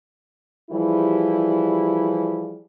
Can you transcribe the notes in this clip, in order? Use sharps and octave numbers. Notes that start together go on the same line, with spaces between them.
E3 F3 G3 E4 G4 G#4